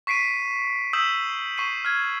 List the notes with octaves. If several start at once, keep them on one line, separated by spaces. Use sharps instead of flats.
C#6 B6 C7 D7 D#7
D#6 E6 G6 B6 E7 F#7
C#6 C7 D#7
F6 G#6